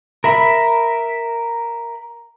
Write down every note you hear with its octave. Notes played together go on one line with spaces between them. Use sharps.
A#4 E5 B5